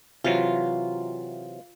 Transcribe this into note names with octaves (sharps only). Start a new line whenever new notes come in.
C3 E3 F#3 F4